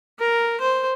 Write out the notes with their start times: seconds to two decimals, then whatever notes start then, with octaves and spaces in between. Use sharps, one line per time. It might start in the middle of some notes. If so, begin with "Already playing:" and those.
0.19 A#4
0.60 C5